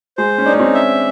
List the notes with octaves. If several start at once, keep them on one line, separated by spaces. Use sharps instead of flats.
G#3 C5
C#4
D4 D#4
C#4
C4
E5